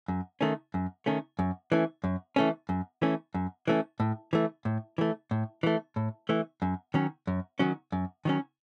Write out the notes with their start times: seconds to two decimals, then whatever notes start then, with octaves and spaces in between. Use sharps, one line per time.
0.08 F#2
0.41 D#3 A3 C#4
0.74 F#2
1.06 D#3 A3 C#4
1.39 F#2
1.72 E3 A3 C#4
2.04 F#2
2.36 E3 A3 C#4
2.69 F#2
3.02 E3 A3 C#4
3.34 F#2
3.68 E3 A3 C#4
4.00 A2
4.33 E3 A3
4.65 A2
4.98 E3 A3
5.31 A2
5.63 E3 A3
5.96 A2
6.29 E3 A3
6.62 F#2
6.94 D#3 F#3 C#4
7.27 F#2
7.59 D#3 F#3 C#4
7.92 F#2
8.25 D#3 F#3 C#4